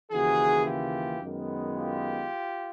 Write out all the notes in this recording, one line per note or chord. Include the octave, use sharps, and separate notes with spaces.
D#2 C#3 E3 F#4 G#4
F4 G4
F#2 D#3 G#3 B3
F4 G4